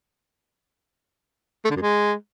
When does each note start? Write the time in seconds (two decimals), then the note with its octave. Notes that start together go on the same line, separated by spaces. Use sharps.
1.65 A3
1.70 D3
1.76 F#2
1.82 G#3